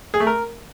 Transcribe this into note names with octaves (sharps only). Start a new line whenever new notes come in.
G#4
A3
A#4